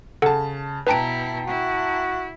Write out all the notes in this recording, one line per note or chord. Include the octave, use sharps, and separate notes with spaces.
C#3 A4 F#5 A5
B2 E4 B4 G5 A5 A#5 D7
E4 F#4